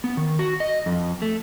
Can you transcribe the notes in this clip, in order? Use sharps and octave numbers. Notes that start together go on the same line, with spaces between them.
B3
D#3
F#4
D#5
F2
A3